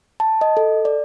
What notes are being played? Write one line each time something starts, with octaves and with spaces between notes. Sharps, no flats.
A5
D#5
A4
D5